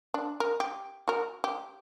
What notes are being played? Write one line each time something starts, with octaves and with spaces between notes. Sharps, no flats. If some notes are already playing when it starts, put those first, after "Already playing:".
D4
A#4
G4
F#4 A#4
G4